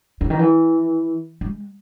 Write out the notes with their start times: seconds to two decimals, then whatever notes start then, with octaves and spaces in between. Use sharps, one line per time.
0.21 C#3
0.30 D#3
0.39 E3
1.41 G#3